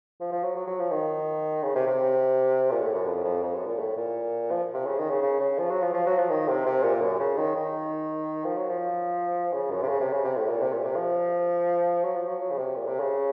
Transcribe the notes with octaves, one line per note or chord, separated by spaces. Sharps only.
F3
F3
F#3
F#3
F#3
F3
D#3
C#3
C3
C3
A#2
A2
F#2
F2
F2
F2
F#2
A#2
A2
A#2
F3
C3
C#3
D#3
C#3
C#3
C#3
F3
F#3
F3
F3
F#3
F3
D#3
C3
C3
A#2
F#2
C#3
D#3
D#3
F3
F#3
F3
C#3
F#2
C3
C#3
C3
C#3
C3
A2
A#2
C3
A#2
C3
F3
F#3
F3
F#3
F#3
C#3
C3
A#2
C3
C#3